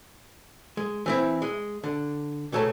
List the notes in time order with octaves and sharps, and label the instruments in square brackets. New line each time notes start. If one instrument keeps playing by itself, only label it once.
[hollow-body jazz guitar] G#3
E3 C4 E4
G#3
D3
B1 C#3 A3 C#5 A5